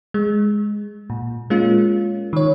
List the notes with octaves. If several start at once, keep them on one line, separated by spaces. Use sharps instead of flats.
G#3
A#2
G#3 A#3 C#4 F4
D#3 C#5